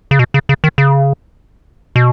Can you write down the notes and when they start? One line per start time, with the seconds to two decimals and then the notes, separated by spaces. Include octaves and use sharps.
0.11 C#3
0.19 B2
0.34 C#3
0.49 C#3
0.64 D#3
0.78 C#3
1.96 B2